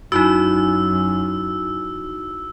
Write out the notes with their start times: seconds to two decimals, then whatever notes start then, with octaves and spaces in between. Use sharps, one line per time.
0.12 F#2 D#4 E4 F#4 E6